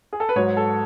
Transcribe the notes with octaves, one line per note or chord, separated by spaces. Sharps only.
G#4
A4
B4
G#2 F#3 C#5
A4